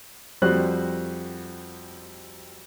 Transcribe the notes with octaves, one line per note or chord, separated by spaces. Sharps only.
F2 G3 F#4 C5 F#6